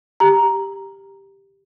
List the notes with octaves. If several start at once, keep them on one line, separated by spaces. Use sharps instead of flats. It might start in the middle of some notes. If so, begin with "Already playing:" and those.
G4 A#5